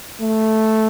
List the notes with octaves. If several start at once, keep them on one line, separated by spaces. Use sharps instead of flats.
A3